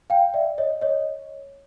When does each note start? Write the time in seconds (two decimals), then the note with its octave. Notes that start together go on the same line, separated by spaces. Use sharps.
0.10 F5 G5
0.34 D5 E5
0.58 C#5 D#5
0.81 C#5 D#5